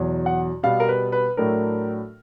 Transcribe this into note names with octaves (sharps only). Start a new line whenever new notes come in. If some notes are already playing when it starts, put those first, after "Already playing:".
Already playing: E2 B2 F#3
F#5
B2 G3 B3 F5
A#4
B4
B4
A2 F#3 A3 D4 A#4